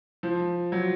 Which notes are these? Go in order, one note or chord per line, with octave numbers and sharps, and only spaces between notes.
F3
F#3